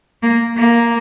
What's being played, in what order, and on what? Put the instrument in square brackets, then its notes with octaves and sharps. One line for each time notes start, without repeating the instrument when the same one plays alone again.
[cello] A#3
A#3